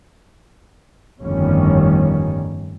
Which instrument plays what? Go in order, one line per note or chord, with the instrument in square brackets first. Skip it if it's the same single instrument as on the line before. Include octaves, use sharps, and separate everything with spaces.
[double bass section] G1 F2 A2 D#3 G3 C#4